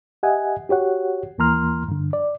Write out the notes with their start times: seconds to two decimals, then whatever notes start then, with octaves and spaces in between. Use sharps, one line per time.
0.23 G4 D#5 E5 F#5 G#5
0.69 F#4 G4 C#5 F#5
1.38 D#2 E3 A#3 A#5 C6 F6
1.88 G2 D3
2.13 D5